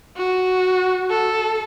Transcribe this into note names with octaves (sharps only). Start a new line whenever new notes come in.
F#4
A4